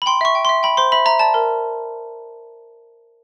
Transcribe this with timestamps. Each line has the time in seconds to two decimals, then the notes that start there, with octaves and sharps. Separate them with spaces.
0.02 B5
0.06 G5 C6
0.21 E5 C#6
0.35 G5
0.45 E5 C6
0.63 G5 B5
0.77 C5 C6
0.92 E5 B5
1.06 E5 A#5
1.19 D5 A5
1.34 A#4